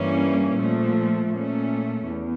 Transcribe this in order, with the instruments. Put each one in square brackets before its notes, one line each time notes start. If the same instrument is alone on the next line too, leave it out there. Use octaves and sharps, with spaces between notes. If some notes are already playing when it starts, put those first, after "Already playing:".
Already playing: [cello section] G2 E3 G3 A#3 C#4
A#2 F3 A3
A#2 A3 C#4
E2